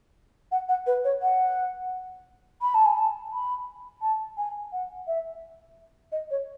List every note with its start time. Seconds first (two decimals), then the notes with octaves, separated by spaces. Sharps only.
0.52 F#5
0.69 F#5
0.87 B4
1.04 C#5
1.22 F#5
2.62 B5
2.74 A5
2.86 G#5
2.98 A5
3.33 B5
4.02 A5
4.37 G#5
4.72 F#5
5.07 E5
6.12 D#5
6.31 C#5